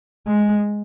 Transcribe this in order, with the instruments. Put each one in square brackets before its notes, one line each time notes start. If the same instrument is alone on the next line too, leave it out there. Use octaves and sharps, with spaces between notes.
[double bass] G#3